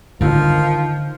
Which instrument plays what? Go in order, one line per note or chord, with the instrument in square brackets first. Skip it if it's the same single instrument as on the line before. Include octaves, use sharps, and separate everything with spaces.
[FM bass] D3 [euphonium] D#3 [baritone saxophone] F3 [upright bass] D4 F4